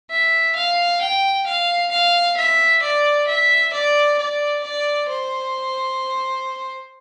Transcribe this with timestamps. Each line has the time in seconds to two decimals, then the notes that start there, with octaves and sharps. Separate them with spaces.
0.11 E5
0.56 F5
1.00 G5
1.46 F5
1.91 F5
2.37 E5
2.82 D5
3.27 E5
3.73 D5
4.18 D5
4.63 D5
5.09 C5